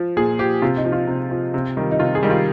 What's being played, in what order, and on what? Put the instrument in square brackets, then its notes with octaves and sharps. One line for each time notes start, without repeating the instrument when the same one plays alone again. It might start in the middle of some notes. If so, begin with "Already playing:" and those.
Already playing: [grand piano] F3
A#2 G#4
F3 G4
C3 F4
D#4
F3
F4
C3
F3
C3
D#3 G3
D#4
C3 F4
G#4
D#3 G3
F4